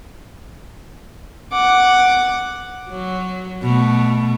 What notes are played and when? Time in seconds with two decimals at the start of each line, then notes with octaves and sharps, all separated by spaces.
1.52 F#5 D6
2.90 F#3
3.62 B2 A3